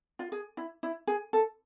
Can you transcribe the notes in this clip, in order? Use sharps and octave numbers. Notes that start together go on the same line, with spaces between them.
F4
G#4
E4
E4
G#4
A4